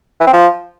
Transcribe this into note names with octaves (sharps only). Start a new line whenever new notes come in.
E3
C4
F3